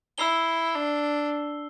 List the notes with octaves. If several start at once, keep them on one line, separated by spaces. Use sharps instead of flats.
E4 E6 C7 G7
D4